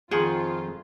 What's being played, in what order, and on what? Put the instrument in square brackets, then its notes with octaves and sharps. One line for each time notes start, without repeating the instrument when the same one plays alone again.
[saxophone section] F2 [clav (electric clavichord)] D#3 F#5 G5 [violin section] F4 [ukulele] G#4